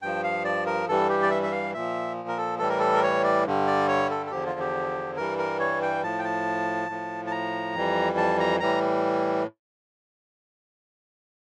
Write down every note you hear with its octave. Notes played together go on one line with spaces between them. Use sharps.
G2 F3 G5
F5
D5
A#4
G2 E3 G3 A4
G4
D5
E5
E5
F5
A#2 F3 E5
A#4
A4
A2 E3 G3 A4
A#4
A4
A#4
C#5
D5
G2 D3 G3
D5
C#5
A4
A4
E2 D3 F3 G4
F4
G4
G2 E3 G3 A#4
A#4
C#5
G5
A2 F3 A5
G5
A5
A2 F3
A5
A#5
F2 E3 G3
A5
A#5
A2 E3 G3 A#5